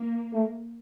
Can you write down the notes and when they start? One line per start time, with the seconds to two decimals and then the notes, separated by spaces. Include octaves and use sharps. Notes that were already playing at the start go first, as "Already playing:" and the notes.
Already playing: A#3
0.33 A3